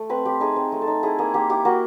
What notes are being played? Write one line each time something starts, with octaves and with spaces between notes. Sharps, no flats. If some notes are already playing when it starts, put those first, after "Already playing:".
Already playing: A3
C4 B4
C4 G4
D#4 G#4
C4
A3
A4
D#4
E4 G#4
A#3 G#4
A#3 G4
E4 G4
A#3 F#4